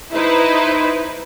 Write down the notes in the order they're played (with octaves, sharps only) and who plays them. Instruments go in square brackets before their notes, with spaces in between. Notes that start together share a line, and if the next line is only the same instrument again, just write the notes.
[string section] D#4 E4 B4 C5